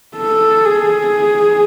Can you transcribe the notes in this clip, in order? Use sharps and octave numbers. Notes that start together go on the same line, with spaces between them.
A4
G#4